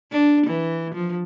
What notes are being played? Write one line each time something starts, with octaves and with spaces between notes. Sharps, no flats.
D4
E3
F3